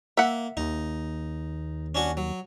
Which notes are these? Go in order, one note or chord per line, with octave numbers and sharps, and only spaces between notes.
A#3 E5 F#5
D#2 D#4
C#4 D4 F#4
F#3